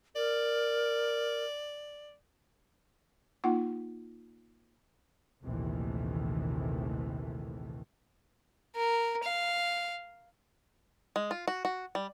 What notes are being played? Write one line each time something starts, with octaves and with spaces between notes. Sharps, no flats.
A#4 D5
A#3 D#4 F4 F#5
A#1 D#2 C3 D#3 E3 A3
A#4
F5
G#3
F4
F#4
F#4
G3